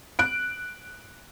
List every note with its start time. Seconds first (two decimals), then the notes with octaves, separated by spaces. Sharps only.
0.19 F#6 D7